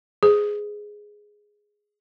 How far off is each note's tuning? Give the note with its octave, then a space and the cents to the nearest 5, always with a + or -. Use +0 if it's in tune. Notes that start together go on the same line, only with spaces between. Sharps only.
G#4 +0 C5 -35